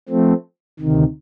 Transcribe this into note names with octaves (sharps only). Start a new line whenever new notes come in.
F3 A3 C4
D2 C3 D#3